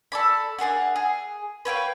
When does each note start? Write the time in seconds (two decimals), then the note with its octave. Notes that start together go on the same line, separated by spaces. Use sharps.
0.12 A4 D5 B5
0.59 D4 G#4 A#4 F#5
0.96 G#4
1.65 B4 C#5 F5 G5